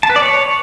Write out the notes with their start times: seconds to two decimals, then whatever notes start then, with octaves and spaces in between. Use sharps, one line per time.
0.03 A5
0.10 B4
0.16 D5
0.22 C#5